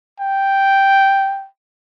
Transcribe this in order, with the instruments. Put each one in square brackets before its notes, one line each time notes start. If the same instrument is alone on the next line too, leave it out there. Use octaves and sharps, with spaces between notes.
[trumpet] G5